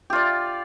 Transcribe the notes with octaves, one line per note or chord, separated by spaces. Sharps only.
F4 G4 D5